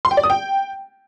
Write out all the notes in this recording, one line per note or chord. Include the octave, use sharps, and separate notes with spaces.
C6
G5
D5
D#6
G5